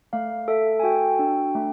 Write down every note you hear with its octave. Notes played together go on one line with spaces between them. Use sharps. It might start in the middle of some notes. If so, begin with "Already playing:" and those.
A3 F5
A4 E5
G#5
F#4 G5
D4
A3